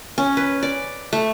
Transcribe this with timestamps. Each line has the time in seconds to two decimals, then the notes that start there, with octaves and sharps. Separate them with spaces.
0.18 C#4
0.37 B4
0.63 D5
1.13 A3